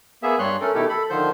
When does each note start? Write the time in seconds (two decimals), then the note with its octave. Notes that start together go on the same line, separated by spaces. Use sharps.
0.23 A#3 B3 G#4 E5
0.39 G2 G3 C#5 C6 F#6
0.61 A3 C#4 A4 A#4
0.75 B2 D#3 A3 E4 G4 A4
0.89 A4 B5
1.10 D3 D#3 F3 C5 G6